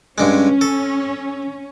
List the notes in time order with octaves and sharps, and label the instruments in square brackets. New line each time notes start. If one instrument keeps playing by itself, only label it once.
[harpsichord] G2 D3 G#3 [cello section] C#4
[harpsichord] A4